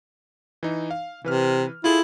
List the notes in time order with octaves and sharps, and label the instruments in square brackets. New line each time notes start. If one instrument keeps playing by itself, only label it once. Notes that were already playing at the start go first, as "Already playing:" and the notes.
[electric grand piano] E3 D#4
F5
[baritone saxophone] C3 [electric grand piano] E3 B4 F6
[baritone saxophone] E4 [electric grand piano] F4 G#4 A4